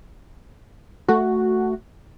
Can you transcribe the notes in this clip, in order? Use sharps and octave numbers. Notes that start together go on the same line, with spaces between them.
A3 F#4